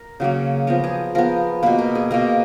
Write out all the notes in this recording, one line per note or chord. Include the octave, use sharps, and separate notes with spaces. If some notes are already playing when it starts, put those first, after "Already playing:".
Already playing: A#4
C#3 F#3 A#3
F3 B3 A#4
G#4
F3 B3 A#4
B2 A#3 B4
A#4
G#4
B2 A#3 A#4